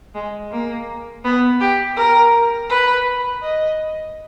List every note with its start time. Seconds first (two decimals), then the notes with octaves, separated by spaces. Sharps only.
0.15 G#3
0.52 A#3
1.24 B3
1.61 G4
1.97 A#4
2.70 B4
3.43 D#5